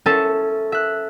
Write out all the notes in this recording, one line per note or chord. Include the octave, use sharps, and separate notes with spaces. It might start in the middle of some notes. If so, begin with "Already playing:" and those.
C#4 A4 C5 E5 A5
E5 F#6